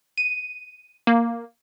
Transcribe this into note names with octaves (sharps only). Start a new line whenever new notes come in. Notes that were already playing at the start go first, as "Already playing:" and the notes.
D#7
A#3